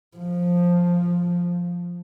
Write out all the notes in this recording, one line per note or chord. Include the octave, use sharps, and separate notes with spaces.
F3